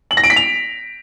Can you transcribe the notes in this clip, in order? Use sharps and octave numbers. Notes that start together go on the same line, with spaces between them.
F#7
A#6
D7
B6
F7